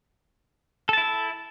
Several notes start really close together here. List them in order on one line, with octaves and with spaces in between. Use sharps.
A4 A5 E4 E5